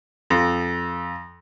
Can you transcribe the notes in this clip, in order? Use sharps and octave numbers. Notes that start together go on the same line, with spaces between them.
F2